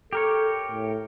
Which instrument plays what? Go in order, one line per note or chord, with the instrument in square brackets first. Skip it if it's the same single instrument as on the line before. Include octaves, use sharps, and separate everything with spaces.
[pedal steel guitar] G4 A#4 C#5 [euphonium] A4
[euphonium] A2